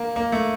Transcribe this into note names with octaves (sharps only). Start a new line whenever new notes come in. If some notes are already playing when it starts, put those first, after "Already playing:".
Already playing: A#3
A#3
A3